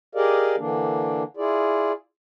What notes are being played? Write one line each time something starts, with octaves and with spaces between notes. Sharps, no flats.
G4 G#4 A#4 D5 D#5 F5
D3 E3 A#3 D4
E4 F4 G#4 D5